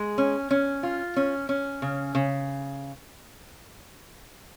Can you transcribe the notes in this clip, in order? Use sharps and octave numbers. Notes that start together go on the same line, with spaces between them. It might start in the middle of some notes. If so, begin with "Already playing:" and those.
Already playing: G#3
C#4
C#4
F4
C#4
C#4
C#3
C#3